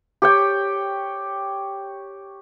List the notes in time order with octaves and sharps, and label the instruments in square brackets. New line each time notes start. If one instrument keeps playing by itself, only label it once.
[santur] G4 C#5 G5